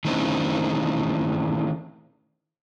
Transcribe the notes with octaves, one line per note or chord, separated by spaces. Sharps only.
D#3 E3 A3 C4 C#4 D#4